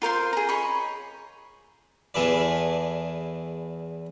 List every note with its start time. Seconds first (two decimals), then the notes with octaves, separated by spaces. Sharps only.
0.02 F4 A#4 C5 C6
0.33 G#4 A#5
0.49 C#5 D#5 B5 C#6
2.14 E2 E3 G#4 A4 B4 D5